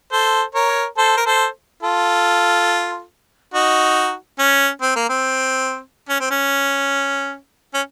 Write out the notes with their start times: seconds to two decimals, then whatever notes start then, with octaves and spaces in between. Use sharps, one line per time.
0.12 A4 C5
0.55 A#4 C#5
0.98 A4 C5
1.17 A#4
1.26 A4 C5
1.83 F4 A4
3.54 D#4 F#4
4.39 C#4
4.82 C4
4.96 A#3
5.09 C4
6.09 C#4
6.20 C4
6.31 C#4
7.74 C#4